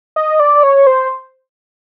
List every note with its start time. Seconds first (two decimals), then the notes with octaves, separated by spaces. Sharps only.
0.16 D#5
0.40 D5
0.63 C#5
0.87 C5